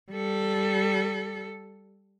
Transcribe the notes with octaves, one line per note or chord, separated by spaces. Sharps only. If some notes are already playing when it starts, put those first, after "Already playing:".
G3 A4